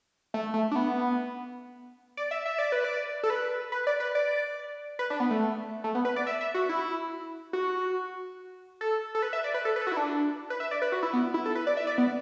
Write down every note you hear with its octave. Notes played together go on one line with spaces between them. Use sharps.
A3
A3
D4
B3
D5
E5
E5
D5
B4
D5
A4
B4
B4
D5
B4
D5
B4
D4
B3
A3
A3
B3
B4
D5
E5
E5
F#4
E4
F#4
A4
A4
B4
E5
D5
B4
A4
B4
A4
F#4
E4
D4
B4
E5
D5
B4
F#4
E4
B3
E4
A4
B4
D5
E5
D5
B3